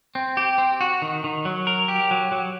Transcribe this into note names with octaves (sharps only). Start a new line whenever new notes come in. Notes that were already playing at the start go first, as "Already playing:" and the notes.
C4
G4
C4
F#4
D#3
D#3
F#3
A#4
G4
F#3
F#3